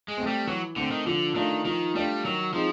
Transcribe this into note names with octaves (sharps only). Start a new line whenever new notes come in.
G#3
A3 C4
G3
E3 F#3
D3 A3 C4
D#3
D3 F3
D#3 A3 D4 F4
D#3 F3
G3 A3 D4 F4
D#3 F#3
F3 G#3 C4 D#4